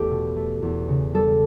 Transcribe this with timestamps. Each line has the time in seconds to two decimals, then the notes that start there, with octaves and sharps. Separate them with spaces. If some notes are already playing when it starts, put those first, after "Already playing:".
Already playing: E2 A3 G4 A4
0.11 B2
0.36 A3
0.62 E2
0.88 C#3
1.14 G3 A4